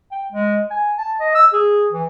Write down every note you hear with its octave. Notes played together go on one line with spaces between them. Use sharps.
G5
G#3
G#5
A5
D#5
E6
G#4
E3